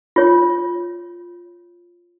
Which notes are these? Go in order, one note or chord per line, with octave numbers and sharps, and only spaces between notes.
F4 C#5